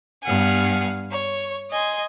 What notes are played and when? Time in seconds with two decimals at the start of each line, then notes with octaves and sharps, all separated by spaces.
0.24 G2 B3 F5 F#5 G#5
1.10 C#5
1.71 D#5 G#5 C6